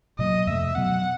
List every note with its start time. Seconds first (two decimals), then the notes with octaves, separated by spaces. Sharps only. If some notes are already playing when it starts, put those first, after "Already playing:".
0.19 B2 F#3 A#3 D#5
0.47 F2 C3 F3 A3 E5
0.75 B2 F#3 B3 F#5